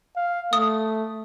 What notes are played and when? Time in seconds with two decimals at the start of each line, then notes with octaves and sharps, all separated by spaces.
0.16 F5
0.53 A3 D#6